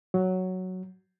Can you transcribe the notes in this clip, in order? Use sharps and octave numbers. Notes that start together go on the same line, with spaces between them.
F#3